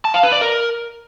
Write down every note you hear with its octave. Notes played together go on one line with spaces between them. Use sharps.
A5
F5
B4
D5
A#4